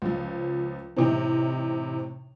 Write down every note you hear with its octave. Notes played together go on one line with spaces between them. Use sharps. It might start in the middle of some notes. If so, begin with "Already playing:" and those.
C#2 F3
A2 C3 E3 C4 D#4